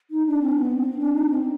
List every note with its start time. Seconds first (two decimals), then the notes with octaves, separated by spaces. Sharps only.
0.11 D#4
0.26 D4
0.41 C4
0.55 B3
0.77 C4
0.99 D4
1.13 D#4
1.28 C4